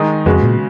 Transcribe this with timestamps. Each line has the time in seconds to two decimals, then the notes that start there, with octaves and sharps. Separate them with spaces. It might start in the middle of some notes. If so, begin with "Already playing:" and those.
Already playing: D#3 G#3 D#4
0.26 F2 C#3 G#3 B3 F#4
0.43 A#2